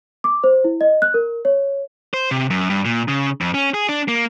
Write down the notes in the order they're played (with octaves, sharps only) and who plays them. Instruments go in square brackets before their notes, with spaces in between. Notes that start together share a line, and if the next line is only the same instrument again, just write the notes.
[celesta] D6
C5
E4
D#5
F#6
A#4
C#5
[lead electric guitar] C5
C3
F#2
G2
A#2
C#3
F2
C#4
G#4
D4
A#3